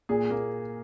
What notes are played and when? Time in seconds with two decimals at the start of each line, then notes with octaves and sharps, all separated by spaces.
0.09 A#2 G#4
0.30 A#3